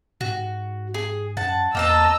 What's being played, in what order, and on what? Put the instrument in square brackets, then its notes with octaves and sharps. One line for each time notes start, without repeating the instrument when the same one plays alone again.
[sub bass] G#2 [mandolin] F#4
[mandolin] G#4
[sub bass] F#2 [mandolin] F#5 A5
[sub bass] E2 [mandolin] A#3 G5 A5 [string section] D#5 A#5 E6